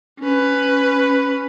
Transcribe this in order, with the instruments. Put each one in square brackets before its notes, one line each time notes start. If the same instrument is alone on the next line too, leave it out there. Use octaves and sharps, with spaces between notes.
[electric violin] C#4 B4